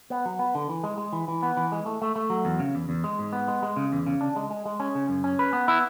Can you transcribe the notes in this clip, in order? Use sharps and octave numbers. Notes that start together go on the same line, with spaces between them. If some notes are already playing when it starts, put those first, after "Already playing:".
B3
F#3
B3
D3
E3
G#3
G#3
E3
E3
B3
E3
G#3
A3
A3
A3
F#3
E2
C#3
E2
E2
G#3
G#2
B3
G#3
G#3
C#3
E2
C#3
D4
G#3
G#3
G#3
C#4
C#3
F#2
C#4
B4
B3
E4